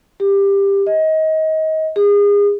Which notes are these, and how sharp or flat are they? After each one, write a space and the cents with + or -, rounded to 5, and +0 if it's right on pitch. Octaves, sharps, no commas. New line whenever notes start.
G4 +15
D#5 +25
G#4 -35